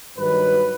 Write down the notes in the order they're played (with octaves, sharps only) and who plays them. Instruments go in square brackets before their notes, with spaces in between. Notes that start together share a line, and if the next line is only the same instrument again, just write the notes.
[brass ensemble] G2 D#3 F#3 B4